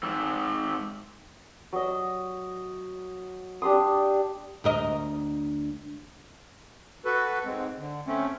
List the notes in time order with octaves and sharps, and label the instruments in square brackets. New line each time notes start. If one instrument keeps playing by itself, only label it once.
[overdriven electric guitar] G#2 C4
[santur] F#3 D#5
D4 G4 C6 D#6
[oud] D2 A#4 D#5
[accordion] F#4 A4 B4
G#2 G#3 C4
D3
A3 C4 C#4